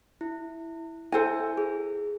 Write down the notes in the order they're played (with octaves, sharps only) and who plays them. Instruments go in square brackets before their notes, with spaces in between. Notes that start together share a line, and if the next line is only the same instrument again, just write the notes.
[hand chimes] E4
[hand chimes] E4 [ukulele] A4 C5 G#5
[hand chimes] G#4